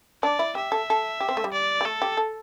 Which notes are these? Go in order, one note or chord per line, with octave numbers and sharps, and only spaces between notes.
D4 D5
E4
G4 E5
A4
A4
G4
C4
A3
G3
D5
G3
A3 A4
G4
A4